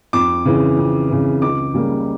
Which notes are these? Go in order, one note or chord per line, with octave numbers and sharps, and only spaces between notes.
F2 D6
C#3 E3
F2
C#3 E3
C#2 D6
C#3 G3 A#3